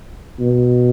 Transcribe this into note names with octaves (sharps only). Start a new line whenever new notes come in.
B2